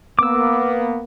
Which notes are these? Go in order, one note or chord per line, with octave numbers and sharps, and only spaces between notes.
A#3 B3 D6 E6